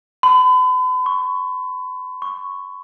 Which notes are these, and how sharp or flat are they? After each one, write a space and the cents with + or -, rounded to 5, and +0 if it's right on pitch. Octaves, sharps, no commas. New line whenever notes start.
B5 +40
C#6 -5
C#6 -5